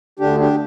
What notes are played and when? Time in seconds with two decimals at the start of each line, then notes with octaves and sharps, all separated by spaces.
0.19 D2 D3 D4 G4
0.39 D4 G4